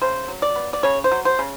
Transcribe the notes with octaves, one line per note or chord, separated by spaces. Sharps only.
C#3 C5
F#3
D5
B3
D5
C#3 C#5
C5
F#3
C5
C#3